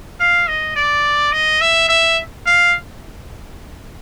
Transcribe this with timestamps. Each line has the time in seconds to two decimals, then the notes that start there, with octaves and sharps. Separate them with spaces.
0.20 F5
0.48 D#5
0.76 D5
1.33 D#5
1.61 E5
1.89 E5
2.46 F5